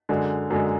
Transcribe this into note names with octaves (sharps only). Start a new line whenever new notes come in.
F#2 D3 G#3
F#2 D3 G#3